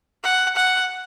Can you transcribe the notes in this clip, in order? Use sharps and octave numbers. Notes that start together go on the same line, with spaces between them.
F#5
F#5